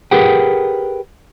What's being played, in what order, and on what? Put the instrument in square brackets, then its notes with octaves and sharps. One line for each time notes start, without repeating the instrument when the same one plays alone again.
[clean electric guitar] G4 G#4 A#4 B4 F#5 G5